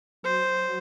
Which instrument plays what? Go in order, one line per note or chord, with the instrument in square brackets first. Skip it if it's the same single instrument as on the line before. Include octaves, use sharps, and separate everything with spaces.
[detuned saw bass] F#3 [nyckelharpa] C5